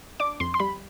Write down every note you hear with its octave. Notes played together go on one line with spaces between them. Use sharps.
D4 D6
F2 C6
C6
G3 B5